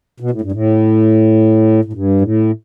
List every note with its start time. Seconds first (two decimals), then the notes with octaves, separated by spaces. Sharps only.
0.20 B2
0.31 A2
0.41 G2
0.52 A2
1.85 A2
1.93 G2
2.21 A2